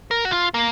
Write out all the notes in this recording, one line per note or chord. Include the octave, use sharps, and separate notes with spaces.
A#4
F#4
F4
A#3